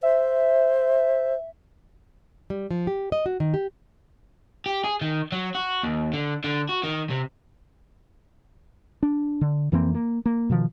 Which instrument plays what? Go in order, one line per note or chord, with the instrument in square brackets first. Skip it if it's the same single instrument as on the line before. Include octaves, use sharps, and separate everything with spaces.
[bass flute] C5 [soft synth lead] E5
[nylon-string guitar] G3
F3
G4
D#5
F#4
D#3
G4
[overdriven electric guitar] G4
G#4
D#3
F#3
F#4
D#2
D3
D3
F#4
D#3
C3
[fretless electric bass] D4
D3
F2 E3 A#3 C4
A#3
A#3
B2 D#3 F3